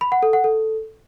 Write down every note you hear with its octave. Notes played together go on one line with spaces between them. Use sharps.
B5
F#5
A4
F#5
A4